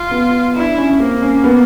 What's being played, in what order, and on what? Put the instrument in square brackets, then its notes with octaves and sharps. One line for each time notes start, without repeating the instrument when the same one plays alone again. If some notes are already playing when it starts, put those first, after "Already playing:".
Already playing: [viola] F4
[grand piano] B3
[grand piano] D4 [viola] E4
[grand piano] C#4
C#4
[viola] A#3 [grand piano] C4
[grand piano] C#4
B3